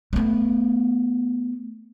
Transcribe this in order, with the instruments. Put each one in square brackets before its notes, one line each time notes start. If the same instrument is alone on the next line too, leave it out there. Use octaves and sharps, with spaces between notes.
[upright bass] A3 B3